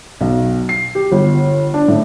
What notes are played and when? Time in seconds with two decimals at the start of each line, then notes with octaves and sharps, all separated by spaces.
0.21 B1
0.69 C7
0.95 G4
1.12 G1
1.74 D4
1.88 A2